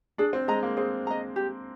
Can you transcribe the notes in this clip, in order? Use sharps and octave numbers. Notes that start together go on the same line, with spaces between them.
D4 G#4
C4
G#3 D#5 A#5
A#3
C4 G#4
D#5 A#5
G4